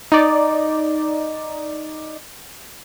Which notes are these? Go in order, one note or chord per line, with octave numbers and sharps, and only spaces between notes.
D#4 D5